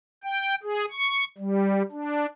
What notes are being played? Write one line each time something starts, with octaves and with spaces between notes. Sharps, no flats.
G5
G#4
C#6
G3
D4